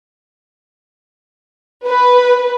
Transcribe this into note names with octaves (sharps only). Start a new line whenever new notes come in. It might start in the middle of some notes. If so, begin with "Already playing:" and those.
B4